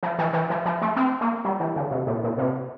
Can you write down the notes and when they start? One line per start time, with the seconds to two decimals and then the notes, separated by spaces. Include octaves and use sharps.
0.03 F3
0.19 E3
0.33 E3
0.50 F3
0.65 F3
0.82 A3
0.96 C4
1.21 A#3
1.45 G3
1.60 E3
1.76 D3
1.91 C3
2.07 A#2
2.23 A#2
2.38 C3